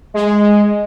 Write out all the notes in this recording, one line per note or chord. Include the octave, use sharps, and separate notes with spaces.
G#3